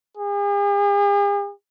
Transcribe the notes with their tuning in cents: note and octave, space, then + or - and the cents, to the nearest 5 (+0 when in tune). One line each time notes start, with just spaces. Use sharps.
G#4 -45